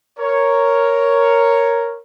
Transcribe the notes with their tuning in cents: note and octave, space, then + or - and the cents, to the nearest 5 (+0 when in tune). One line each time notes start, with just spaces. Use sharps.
A#4 +0 C#5 +0